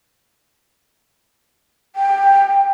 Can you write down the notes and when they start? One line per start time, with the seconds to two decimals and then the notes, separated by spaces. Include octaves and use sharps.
1.96 G5